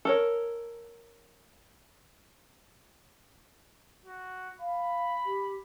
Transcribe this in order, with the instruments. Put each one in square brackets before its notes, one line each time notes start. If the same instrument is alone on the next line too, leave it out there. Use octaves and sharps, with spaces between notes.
[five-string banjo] A4 A#4 C#5
[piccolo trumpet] F#4
[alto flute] F5 [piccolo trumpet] B5
[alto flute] G4